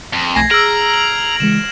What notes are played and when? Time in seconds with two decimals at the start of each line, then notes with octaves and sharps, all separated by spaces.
0.13 F2
0.35 B1 A3 G#5 G#6 A#6 C7
0.51 G#4 A#5 E6 F6 D7 F#7
0.94 F#7
1.40 C#3 E3 G#3 E7